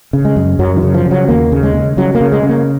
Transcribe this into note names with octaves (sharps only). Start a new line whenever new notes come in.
C#3
G#3
F#2
F#2 F#3
D#3
C#3
F3
C#3
F#3
D#2 A#3
C#3
G#3
C#3
C#3 F#3
A#3
C#3
G#3
C#3
A#3